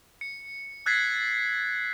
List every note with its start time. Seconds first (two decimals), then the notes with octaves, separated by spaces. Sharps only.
0.21 C#7
0.86 E6 F#6 G#6 A6 B6 C7